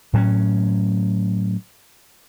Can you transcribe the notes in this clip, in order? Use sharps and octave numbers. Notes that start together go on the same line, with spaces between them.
A2 F#3 C4 C#4